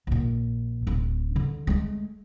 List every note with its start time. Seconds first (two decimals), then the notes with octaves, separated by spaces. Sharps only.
0.07 A#1 A#2
0.87 D1
1.36 D3
1.67 G#3 A3